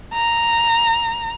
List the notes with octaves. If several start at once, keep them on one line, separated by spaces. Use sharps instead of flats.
A#5